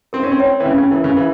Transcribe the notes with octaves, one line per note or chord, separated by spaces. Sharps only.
C4 A#4
C#4
C4
C#5 G5
E3
C#3 C#4
C#3
E3 E4 A#4
C#3
E3 A#4